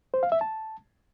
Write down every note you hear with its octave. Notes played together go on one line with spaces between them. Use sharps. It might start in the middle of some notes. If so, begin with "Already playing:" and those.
C5
F5
E5
A5